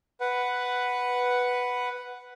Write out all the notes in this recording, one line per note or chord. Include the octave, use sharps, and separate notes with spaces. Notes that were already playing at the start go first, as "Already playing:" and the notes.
B4 F#5